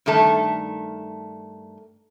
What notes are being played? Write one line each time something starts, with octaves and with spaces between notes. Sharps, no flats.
G2 D#3 A3 A5